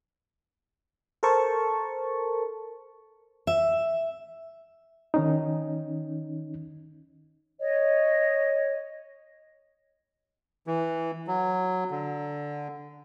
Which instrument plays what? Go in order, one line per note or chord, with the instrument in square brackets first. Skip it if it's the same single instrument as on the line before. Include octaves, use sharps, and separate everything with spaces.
[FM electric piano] A4 A#4 C5 A5 C#6
[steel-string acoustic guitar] E5
[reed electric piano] D#3 C#4 D#4
[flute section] C#5 D#5
[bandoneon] E3
F#3
D3